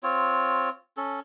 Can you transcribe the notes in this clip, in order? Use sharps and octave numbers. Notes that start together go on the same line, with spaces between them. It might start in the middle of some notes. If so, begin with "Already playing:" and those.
C4 F4 C#5
C#4 A4